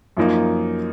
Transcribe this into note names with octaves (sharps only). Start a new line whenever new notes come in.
F#2 F3 A#3 D#4